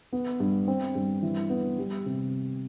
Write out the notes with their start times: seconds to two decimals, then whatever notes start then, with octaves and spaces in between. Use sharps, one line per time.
0.13 B3
0.40 G2
0.68 C4
0.95 G2
1.23 E3
1.50 B3
1.78 G3
2.06 C3